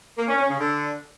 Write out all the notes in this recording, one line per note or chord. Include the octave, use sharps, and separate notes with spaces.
A#3
C#4
C#4
C#3
D3